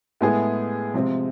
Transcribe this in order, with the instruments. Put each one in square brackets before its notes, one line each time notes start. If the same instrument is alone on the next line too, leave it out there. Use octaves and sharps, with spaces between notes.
[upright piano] A2 G#3 B3 E4 G#4
C3 F3 G#3 C4 F4